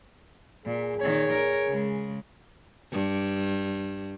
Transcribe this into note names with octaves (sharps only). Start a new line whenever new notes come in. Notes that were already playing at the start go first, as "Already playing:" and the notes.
A#2 G#4
A#2 D#3 C#5
A#4
C#3 G#3
G2